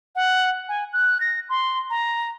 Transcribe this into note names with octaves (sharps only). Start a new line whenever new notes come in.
F#5
G#5
F#6
A#6
C6
A#5